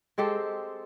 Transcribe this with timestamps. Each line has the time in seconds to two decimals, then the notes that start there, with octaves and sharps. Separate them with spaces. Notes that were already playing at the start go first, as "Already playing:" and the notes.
0.18 G#3 C4 G4 A4